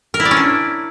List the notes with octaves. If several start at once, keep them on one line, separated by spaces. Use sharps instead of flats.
A#4
E4
D5
C#4
D4